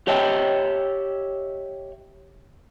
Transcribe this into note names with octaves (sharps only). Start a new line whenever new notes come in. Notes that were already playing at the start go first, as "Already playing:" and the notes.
G4 C#5 D#5 E5 G5